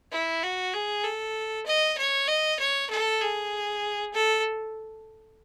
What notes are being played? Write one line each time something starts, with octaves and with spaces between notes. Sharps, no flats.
E4
F#4
G#4
A4
D#5
C#5
D#5
C#5
A4
G#4
A4